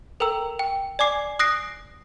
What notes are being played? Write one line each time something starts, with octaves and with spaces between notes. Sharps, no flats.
A4 A#4 G5 A#5 E6
G5
D5 G#5 D6 C7
D#6 F#6 A#6 C7 D7